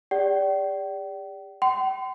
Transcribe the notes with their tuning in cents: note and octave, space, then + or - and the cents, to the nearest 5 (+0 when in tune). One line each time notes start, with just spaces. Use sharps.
G4 +45 D5 -20 G5 -35
G5 -45 C6 -35